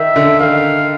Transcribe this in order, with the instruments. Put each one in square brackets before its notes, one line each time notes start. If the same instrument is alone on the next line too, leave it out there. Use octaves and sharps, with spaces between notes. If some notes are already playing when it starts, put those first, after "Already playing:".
Already playing: [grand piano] D#3 [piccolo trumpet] E5
[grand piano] D3
[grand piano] D#3 [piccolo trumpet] F5